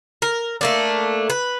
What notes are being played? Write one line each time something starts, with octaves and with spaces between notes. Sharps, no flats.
A#4
A3 A#3 D4
B4